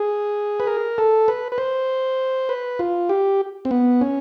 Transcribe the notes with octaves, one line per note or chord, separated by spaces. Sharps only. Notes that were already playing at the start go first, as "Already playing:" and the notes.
Already playing: G#4
B4
A#4
A4
B4
B4
C5
B4
F4
G4
C4
B3
C#4